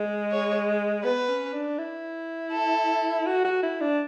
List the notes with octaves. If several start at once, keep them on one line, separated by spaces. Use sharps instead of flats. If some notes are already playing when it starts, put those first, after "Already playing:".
Already playing: G#3
C#5
B3 B4
C#4
D4
E4
A4
F#4
F#4
E4
D4